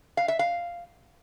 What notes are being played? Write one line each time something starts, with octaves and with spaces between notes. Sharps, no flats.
F5
E5
F5